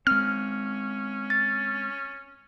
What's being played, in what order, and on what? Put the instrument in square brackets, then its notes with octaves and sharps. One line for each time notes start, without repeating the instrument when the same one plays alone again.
[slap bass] G#3 C4 [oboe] C#4 [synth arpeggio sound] F6
[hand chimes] A6